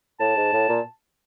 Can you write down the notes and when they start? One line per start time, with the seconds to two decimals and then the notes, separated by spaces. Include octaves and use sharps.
0.20 A2 A5
0.37 G#2
0.53 A2
0.69 A#2